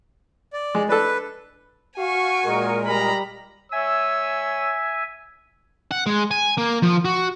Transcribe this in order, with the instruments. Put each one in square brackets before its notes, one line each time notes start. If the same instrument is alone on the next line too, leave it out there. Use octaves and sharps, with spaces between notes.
[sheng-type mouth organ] D5
[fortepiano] G#3
[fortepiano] D4 A4 [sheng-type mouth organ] B4
[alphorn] F#4 [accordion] F5 [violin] G#5 C#6
[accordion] A#2 G#3 A#4
[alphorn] G3 [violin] A#5 B5
[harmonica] C#5 E6 [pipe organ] E5 G#5
[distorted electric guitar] F#5
G#3
G#5
A#3
F3
F#4